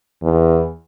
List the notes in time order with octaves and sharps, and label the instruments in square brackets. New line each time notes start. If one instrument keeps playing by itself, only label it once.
[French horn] E2